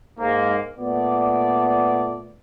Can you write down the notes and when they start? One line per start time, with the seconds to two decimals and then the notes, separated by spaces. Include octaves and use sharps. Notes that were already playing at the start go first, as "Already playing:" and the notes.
0.19 G#2 A#3
0.78 A#2 A3 B3 D5